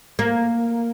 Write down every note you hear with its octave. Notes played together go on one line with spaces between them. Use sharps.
A#3